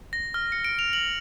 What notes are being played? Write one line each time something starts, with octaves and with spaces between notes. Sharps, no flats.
A#6
F6
C#7
D7
F7
F#7